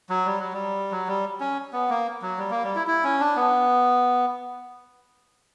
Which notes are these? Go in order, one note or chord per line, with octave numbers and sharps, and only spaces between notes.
F#3
G3
F#3
G3
F#3
G3
C#4
B3
A#3
F#3
G3
A#3
G3
E4
E4
C#4
D4
B3